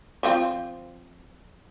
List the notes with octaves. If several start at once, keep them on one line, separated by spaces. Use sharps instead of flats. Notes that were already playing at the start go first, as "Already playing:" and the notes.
F3 C4 F4